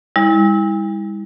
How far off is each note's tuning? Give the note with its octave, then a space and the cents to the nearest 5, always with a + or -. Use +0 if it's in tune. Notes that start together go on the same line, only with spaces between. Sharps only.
G3 +45 E4 -30